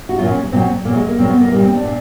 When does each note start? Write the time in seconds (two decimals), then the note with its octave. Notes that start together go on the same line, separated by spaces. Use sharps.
0.09 F#4
0.19 A#2 F#3 F4
0.31 C#4
0.52 A#2 F#3 C4
0.85 A#2 A#3
0.89 F#3
0.96 G#3
1.08 A#3
1.19 A#2 F#3 C4
1.29 B3
1.41 A#3
1.52 A#2 G3 A#3
1.63 C4
1.73 D4
1.84 A#2